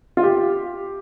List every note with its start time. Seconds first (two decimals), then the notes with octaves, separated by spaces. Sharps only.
0.17 F4
0.23 G4